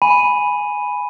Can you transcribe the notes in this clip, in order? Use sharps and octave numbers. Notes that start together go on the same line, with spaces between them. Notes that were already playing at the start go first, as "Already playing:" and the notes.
G#5 B5 D#7